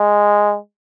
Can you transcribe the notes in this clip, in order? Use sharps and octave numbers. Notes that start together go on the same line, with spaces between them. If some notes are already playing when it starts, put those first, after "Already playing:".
Already playing: G#3